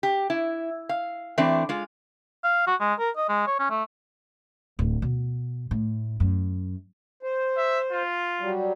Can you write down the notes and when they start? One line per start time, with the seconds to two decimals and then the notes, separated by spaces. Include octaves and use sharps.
0.03 G4
0.30 E4
0.89 F5
1.38 E3 A3 C4 D4
1.69 G#3 F4
2.44 F5
2.67 F#4
2.80 G#3
2.99 A#4
3.17 D#5
3.29 G#3
3.47 C#5
3.59 C#4
3.70 A3
4.79 D1
5.02 B2
5.71 A2
6.20 F#2
7.23 C5
7.57 E5
7.92 F4
8.41 F#3 G3